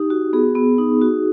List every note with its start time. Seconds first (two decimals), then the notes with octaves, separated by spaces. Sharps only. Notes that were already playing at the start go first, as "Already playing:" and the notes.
Already playing: D#4 G4
0.10 F#4
0.33 B3 G#4
0.55 B3
0.78 D#4
1.01 F#4